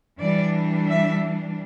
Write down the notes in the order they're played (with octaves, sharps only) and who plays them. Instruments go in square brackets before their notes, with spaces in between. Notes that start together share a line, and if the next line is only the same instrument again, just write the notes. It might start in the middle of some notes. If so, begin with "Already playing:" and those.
[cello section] E3 G3 D4 D5
E5